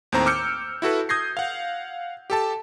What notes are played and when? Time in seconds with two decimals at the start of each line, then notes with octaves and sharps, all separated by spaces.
0.12 D#2 A2 C4 C5 A#5
0.26 D6 E6 F6 G6 C#7
0.82 E4 F#4 A4 B4
1.09 D#6 G6 G#6 A#6 C7
1.37 F5 F#5
2.30 G4 A4 A5